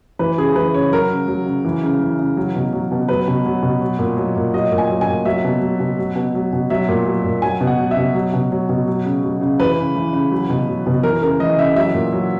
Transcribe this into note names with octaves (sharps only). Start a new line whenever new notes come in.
E3 B4
C#3 G#4
E3 B4
C#3 C#5
F#3 A#4
C#3
F#3
C#3
E3
C#3
E3
C#3
F#3
B2
F#3
B2
F#3 B4
B2
F#3
B2
F#3
A#2
F#3
A#2
F#3 D#5
A#2
G#5
F#3
G#5
A#2
F#3 E5
B2
F#3
B2
F#3
B2
F#3
B2
F#3 E5
A#2
F#3
A#2
F#3 G#5
B2
F#5
F#3
E5
B2
F#3
B2
F#3
B2
F#3
C#3
F#3
C#3
E3 B4
C#3
E3
C#3
F#3
B2
F#3
B2
E3 A#4
C#3 A#4
E3 D#5
C#3 E5
F#3 E5
A#2
F#3